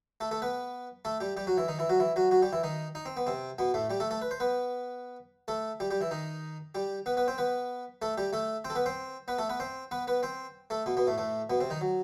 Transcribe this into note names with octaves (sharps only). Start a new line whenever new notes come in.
A3 A4
A3 A4
B3 B4
A3 A4
G3 G4
G3 G4
F#3 F#4
E3 E4
D#3 D#4
E3 E4
F#3 F#4
E3 E4
F#3 F#4
F#3 F#4
G3 G4
E3 E4
D#3 D#4
D#4
C4
B3
C3 C4
B2 B3
A2 A3
G3 G4
A3 A4
A3 A4
B4
C5
B3 B4
A3 A4
G3 G4
G3 G4
E3 E4
D#3 D#4
G3 G4
B3 B4
B3 B4
C4 C5
B3 B4
A3 A4
G3 G4
A3 A4
C4 C5
A4
B3 B4
C4 C5
B3 B4
A3 A4
B3 B4
C4 C5
B3 B4
B3 B4
C4 C5
A3 A4
B2 B3
B2 B3
A2 A3
A2 A3
B2 B3
C3 C4
D#3 D#4
F#3